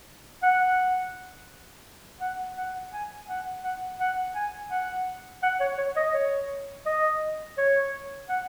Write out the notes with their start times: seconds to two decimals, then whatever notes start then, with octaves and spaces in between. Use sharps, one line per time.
0.43 F#5
2.20 F#5
2.57 F#5
2.93 G#5
3.29 F#5
3.63 F#5
4.00 F#5
4.35 G#5
4.71 F#5
5.43 F#5
5.60 C#5
5.78 C#5
5.96 D#5
6.14 C#5
6.86 D#5
7.58 C#5
8.29 F#5